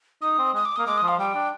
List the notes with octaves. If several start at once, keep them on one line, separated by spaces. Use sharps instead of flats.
D#4 D#6
C4
G#3 D#6
D6
A#3 D#6
G#3 D6
D#6
F3
F5
G3 G5
D4